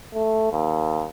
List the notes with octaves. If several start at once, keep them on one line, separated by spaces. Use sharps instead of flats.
A3
D#2